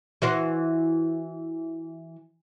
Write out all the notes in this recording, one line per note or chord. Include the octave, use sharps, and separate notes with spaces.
E3 F#4 C5